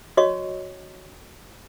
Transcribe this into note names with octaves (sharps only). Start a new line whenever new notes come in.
F#4 C#5 D#5 C#6